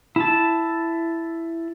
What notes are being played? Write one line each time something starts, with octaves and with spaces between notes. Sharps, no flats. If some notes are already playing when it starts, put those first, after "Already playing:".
E4 A5